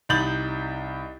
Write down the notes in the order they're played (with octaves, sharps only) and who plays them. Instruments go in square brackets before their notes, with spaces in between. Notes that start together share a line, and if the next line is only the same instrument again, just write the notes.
[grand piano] C2 D#4 B5 G6 A6 F#7